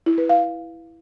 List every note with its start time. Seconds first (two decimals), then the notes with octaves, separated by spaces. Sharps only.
0.06 E4
0.18 B4
0.29 F5